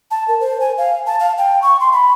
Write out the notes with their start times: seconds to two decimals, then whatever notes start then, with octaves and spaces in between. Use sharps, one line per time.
0.11 A5
0.28 A#4
0.41 C5
0.60 G#5
0.78 F5
1.06 A5
1.20 F5
1.38 G5
1.62 C#6
1.80 C6
1.92 B5